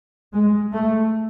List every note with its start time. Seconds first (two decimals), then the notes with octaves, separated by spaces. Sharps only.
0.32 G#3
0.73 A3